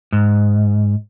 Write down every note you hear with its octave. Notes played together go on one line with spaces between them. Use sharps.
G#2